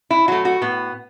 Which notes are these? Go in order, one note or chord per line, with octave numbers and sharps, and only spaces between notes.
E4
F#3 A3 F#4
F#4
A2 B3